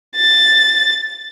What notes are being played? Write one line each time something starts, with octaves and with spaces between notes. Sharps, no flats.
A6